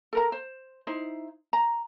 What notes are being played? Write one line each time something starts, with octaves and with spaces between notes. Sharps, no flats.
A4 A#4 A#5
C5
D#4 E4 C5
A#5